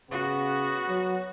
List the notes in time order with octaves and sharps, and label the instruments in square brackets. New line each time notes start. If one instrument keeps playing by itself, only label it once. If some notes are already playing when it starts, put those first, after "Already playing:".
[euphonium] C#3 [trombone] B3 [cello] F#4
[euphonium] F#3